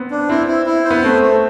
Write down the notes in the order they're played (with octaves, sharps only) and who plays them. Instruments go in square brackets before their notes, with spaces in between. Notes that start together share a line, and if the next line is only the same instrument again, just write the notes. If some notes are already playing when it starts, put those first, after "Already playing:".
Already playing: [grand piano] B3 C4
[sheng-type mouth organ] D4
[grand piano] C4 [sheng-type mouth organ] E4
[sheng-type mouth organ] E4
E4
C5
[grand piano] B3
[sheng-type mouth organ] A3 [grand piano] C4
[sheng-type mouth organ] A3